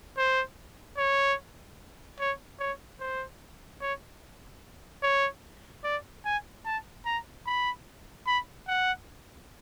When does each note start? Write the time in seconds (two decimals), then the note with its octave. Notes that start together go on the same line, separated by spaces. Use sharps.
0.18 C5
0.98 C#5
2.20 C#5
2.60 C#5
3.00 C5
3.81 C#5
5.03 C#5
5.84 D5
6.25 G#5
6.65 A5
7.06 A#5
7.47 B5
8.27 B5
8.68 F#5